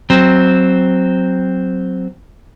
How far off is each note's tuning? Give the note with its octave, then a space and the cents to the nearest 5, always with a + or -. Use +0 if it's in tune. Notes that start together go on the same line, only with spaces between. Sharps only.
F#3 +5 C4 +0